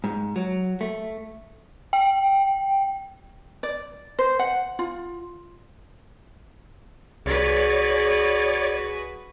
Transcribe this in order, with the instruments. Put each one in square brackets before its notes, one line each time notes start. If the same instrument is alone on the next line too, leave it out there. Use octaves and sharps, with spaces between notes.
[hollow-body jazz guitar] G#2
F#3
A3
[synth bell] G5
[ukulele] D5
C5
F#5
F4
[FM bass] C2 [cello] F#4 B4 [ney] G#4 [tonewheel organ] C#5 D5